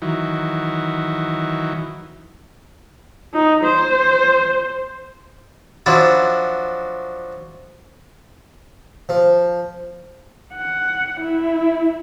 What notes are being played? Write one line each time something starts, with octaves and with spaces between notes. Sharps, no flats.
D#3 E3 F#3
D#4
C5
F3 F#3 D4 E4 F#4
F3
F#5
E4